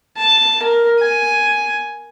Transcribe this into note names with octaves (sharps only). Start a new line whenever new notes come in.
A5
A#4
G#5